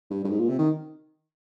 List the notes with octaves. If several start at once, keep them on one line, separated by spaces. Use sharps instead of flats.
G2
G2
G#2
A#2
C3
D#3